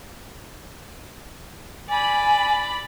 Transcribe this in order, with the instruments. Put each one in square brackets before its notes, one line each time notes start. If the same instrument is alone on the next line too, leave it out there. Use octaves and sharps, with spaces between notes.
[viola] D5 B5 [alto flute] G#5